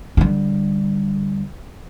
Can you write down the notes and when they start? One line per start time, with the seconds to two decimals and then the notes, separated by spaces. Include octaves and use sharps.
0.17 D3 G3